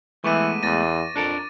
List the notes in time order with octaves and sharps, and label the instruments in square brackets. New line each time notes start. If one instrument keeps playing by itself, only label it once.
[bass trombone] E3 [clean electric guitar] G#3 A3 B3 [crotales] C#6 D6 D#7
[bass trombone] E2 [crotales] A6 A#6 D#7
[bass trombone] F2 [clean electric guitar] D4 A4 A#4